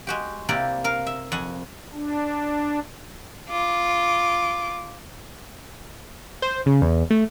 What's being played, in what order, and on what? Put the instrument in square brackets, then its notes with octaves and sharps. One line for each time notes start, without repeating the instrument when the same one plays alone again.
[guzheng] G#3 F#4 G4
C3 A#3 E4 G4 D5 F#5
A#4 F5
E5
F2 F#5 G#5
[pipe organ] D4
[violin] F4 D6
[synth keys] C5
C#3
E2
A3